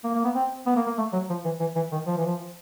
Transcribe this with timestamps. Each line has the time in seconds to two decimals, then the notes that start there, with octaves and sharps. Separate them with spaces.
0.04 A#3
0.14 A#3
0.24 B3
0.35 C4
0.67 B3
0.76 A#3
0.87 A#3
0.98 A3
1.13 F#3
1.29 F3
1.45 E3
1.60 E3
1.75 E3
1.92 D#3
2.07 F3
2.17 E3
2.26 F3